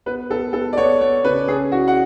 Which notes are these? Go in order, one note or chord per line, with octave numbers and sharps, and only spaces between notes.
B3 B4
B3 A4
B3 A4
D5
B3 C#5
B3 C#5
C#3 B4
C#4 G#4
E4 F#4
F#5